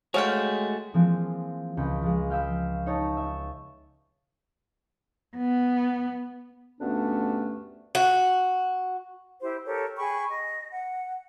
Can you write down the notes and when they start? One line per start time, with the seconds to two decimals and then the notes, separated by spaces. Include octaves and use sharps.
0.14 G#3 A3 F#4 C#5 F5 G5
0.94 E3 F3 G#3 A#3 C4
1.77 C#2 G5 B5
2.02 F3 G#3
2.30 F5 G5 B5 E6
2.86 D#4 C#5 A5
3.17 E5
5.37 B3
6.81 D2 G2 A3 B3 C#4 D4
7.95 F#4
9.41 E4 G4 C5
9.65 G4 A4 A#4 C#5
9.97 G#4 G5 B5 C#6
10.28 D#5
10.71 F#5